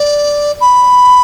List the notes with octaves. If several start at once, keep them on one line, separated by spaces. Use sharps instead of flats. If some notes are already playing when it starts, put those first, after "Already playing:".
Already playing: D5
B5